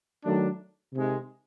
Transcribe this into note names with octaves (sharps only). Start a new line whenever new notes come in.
D#3 F#3 A3 D4
C3 D#3 G#3